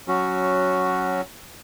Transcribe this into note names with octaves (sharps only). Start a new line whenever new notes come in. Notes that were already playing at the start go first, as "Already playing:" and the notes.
F#3 C#4 F#4